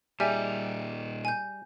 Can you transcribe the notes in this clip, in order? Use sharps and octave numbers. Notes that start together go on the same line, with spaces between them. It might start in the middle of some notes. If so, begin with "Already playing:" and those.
A#2 G3 D#4 G#4 E5 G#5
G#5 G6